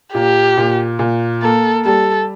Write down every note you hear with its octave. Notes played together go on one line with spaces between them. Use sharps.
A#2 G4
A#2
A#2
A#3 A4
G3 A4